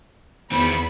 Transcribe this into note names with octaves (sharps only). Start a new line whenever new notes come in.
E2 D#3 C4 B5